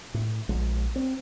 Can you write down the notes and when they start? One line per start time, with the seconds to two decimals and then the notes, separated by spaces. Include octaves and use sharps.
0.14 A2
0.49 A#1 G#3
0.96 C4